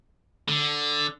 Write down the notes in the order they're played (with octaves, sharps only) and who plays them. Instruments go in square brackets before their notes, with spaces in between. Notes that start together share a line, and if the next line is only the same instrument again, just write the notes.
[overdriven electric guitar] D3